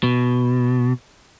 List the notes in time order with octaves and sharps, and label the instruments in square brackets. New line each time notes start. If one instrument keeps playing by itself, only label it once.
[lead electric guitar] B2